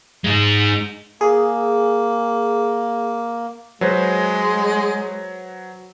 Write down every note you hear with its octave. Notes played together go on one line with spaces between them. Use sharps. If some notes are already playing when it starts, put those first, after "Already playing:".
G#3 D#4
A#3 G#4
F#3 G#3 B4 C5